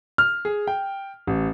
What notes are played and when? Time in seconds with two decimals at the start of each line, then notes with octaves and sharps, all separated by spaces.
0.18 F6
0.45 G#4
0.67 G5
1.27 A1